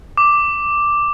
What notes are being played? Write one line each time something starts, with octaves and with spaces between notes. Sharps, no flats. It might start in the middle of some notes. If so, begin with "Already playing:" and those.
D6